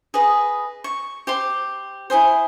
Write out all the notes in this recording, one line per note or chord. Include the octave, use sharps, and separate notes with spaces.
G#4 B4 D#5
C#6
G4 C5 C6
E4 F4 G#4 C5